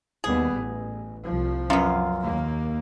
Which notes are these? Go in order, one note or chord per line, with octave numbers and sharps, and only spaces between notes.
D#2 G3 B3 G#4
A1
C2 F3
F#2 B3 F4
D#2 A#3